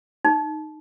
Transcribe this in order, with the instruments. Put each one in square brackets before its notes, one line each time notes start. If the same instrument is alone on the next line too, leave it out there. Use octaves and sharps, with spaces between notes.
[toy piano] D#4